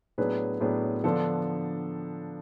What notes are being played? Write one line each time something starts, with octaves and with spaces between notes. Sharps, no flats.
A2 F#3 B3 D4 G#4 B4
A2 F#3 B3 D4 G#4 B4
D3 F3 B3 D4 A4